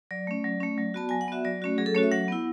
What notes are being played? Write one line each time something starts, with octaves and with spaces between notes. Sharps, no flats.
F#3 D5
A3 C#4
F#3
A3 C#4
F#3
B3 F#4 A5
F#3 G#5
F#5
B3 F#4 E5
F#3 D5
A3 C#4 F#4
F#3 G#4
A4
A3 C#4 F#4 C#5
E5
F#3 F#5
B3 E4